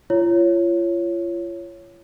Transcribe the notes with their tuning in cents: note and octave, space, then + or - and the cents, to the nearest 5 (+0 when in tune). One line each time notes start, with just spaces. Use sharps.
F4 -35 C#5 +0